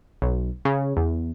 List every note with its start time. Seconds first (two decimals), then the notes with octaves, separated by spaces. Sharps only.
0.22 B1
0.65 C#3
0.97 E2